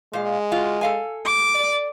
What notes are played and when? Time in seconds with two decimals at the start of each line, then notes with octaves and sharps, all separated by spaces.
0.13 A#2 G#3 F5
0.52 F4 F#4
0.81 A4 F5 G#5
1.26 D6
1.55 D5